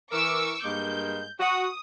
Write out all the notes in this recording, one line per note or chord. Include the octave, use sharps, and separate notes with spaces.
E3 A#4 C#6 D6 E6
G2 G#3 A#3 G6
F#4 D#6